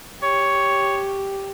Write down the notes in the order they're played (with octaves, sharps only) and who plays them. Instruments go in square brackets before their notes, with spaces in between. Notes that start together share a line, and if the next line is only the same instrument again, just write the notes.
[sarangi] G4 [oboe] C#5